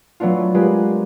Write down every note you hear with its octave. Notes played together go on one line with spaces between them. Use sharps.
F#3 A3 B3 D4 F4
G#3 F4 G4 A#4 B4